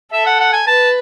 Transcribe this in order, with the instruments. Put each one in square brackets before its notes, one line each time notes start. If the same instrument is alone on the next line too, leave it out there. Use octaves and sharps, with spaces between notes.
[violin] A4 [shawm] E5
[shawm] F#5
F#5
G#5
[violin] B4 [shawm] A5